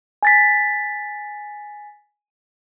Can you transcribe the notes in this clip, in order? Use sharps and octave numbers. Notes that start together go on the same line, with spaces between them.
G#5 A6 B6